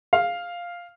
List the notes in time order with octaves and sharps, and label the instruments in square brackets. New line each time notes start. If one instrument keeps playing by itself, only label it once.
[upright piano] F5